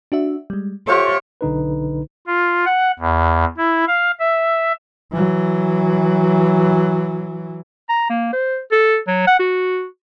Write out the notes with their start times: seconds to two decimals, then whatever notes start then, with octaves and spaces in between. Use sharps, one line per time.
0.12 D4 F#4 E5
0.50 G3 G#3
0.87 F4 G4 A4 C5 C#5 E5 F#5 D6
1.41 B1 D3 D#4 B4
2.27 F4
2.65 F#5
2.99 E2
3.57 E4
3.88 F5
4.20 E5
5.12 E3 F#3
7.89 A#5
8.10 A#3
8.33 C5
8.72 A4
9.07 F#3
9.27 F#5
9.39 F#4